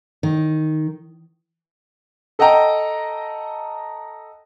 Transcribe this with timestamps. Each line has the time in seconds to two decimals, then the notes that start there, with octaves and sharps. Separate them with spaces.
0.23 D#3
2.39 A4 D#5 F#5 G5 A#5